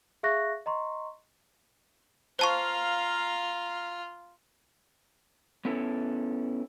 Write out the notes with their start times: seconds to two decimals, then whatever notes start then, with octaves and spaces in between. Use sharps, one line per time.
0.23 G#4 E5 F5 C#6 F#6 A#6
0.66 D#5 A#5 C6 C#6
2.39 F4 C5 F5 A5 A#5 C#6
5.65 B3 C#4 E4 A4